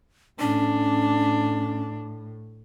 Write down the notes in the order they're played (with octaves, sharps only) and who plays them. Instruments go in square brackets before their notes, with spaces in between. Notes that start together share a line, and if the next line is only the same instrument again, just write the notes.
[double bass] A2 [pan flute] C#4 [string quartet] D4